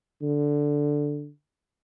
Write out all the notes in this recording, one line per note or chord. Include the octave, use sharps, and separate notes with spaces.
D3